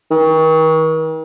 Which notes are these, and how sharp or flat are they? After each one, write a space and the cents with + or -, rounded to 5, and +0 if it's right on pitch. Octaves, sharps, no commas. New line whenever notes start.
D#3 +40